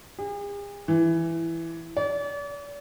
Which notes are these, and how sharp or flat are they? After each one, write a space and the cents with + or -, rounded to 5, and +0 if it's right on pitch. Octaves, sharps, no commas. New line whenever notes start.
G#4 -45
E3 +10
D5 -40